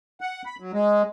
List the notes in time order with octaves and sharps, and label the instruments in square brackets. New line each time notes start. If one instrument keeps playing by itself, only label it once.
[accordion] F#5
B5
F#3
G#3